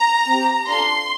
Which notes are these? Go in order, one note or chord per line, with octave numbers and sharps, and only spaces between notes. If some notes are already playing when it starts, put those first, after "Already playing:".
Already playing: A#5
C4 G4
D4 F4 A4 C6